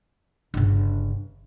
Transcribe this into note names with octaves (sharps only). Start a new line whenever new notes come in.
G1 C#3